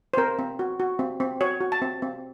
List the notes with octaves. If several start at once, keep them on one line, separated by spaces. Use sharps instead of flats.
C5
C4 A#4
C4
F#4
F#4
C4
C4
F#4 C#5
F#4
A5
C4
C4